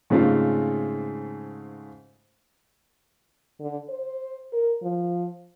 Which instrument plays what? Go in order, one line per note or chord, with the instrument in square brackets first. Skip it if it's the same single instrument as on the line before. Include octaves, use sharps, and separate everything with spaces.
[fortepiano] G#2 C#3 G#3 A3 C4 F4
[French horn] D3
C5
A#4
F3